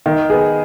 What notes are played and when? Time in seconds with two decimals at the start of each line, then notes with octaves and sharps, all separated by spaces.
0.06 D#3
0.30 B3 G#4